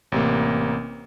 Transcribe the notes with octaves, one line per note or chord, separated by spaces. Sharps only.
A1 C3 A#3